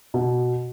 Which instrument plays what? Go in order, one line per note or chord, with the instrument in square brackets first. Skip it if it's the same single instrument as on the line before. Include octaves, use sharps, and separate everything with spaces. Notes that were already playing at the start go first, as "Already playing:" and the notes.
[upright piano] B2